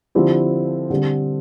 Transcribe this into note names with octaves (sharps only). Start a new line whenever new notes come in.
D3 F3 C4 E4 G4
D3 G3 C4